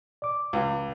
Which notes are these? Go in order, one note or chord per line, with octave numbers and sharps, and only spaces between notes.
D5 D6
C#2